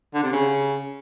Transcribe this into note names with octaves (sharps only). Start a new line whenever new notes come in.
D3
C3
C#3